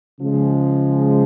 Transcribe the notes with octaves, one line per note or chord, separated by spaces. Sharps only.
C#3 F3 G#3